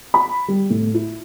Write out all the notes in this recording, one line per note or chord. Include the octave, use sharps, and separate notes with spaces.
B5
G3
A2
E4